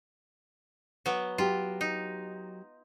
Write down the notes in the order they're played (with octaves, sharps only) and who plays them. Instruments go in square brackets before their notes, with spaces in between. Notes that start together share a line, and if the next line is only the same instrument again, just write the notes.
[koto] F#3 B3
[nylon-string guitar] F#3 G4 [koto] F4
[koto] D#4